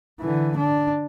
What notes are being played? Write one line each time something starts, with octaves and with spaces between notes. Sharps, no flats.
D3 E3
D4